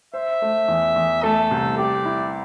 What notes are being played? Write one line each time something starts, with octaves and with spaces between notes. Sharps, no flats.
C5 E5
A3
E2
E2
A3 A4
C2
G4 D5
E4